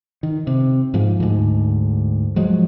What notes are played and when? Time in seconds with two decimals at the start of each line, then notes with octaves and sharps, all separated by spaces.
0.23 D#3
0.47 C3
0.94 G#2 F3
1.20 D2 G#2
2.36 F3 F#3 G#3